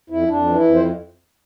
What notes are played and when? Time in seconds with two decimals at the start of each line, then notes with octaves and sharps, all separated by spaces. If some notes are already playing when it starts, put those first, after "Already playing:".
0.10 F2 E4
0.28 F2 D4
0.47 E3
0.55 E4
0.63 F2
0.74 C5